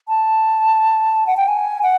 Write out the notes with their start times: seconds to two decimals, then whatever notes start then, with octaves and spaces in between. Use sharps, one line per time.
0.08 A5
1.27 F#5
1.37 G5
1.48 G#5
1.83 F#5